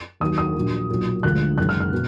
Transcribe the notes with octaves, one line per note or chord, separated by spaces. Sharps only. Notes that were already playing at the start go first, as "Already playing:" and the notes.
D#2 D#3 F#3 D#6
D#6
A#1 A#2 F#3
B1 A#2 F#3
D2 D3 F3 G#3 F#6
F#1 F#2 D#3 G#3 F#6
F6
F6
B2